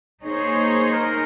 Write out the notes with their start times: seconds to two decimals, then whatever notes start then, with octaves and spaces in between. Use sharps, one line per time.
0.23 A#3 D#4 G#4 C5 C#5
0.93 A#4